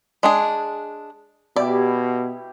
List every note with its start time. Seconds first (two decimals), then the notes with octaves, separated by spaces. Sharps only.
0.23 G#3 D4 G#4
1.56 B2 E4 G4 D5